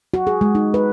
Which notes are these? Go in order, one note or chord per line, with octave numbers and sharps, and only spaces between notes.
F#4
G#4
G#3
D#4
B4